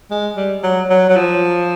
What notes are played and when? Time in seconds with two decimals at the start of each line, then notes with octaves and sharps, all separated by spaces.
0.10 G#3
0.36 G3
0.63 F#3
0.90 F#3
1.09 F#3
1.16 F3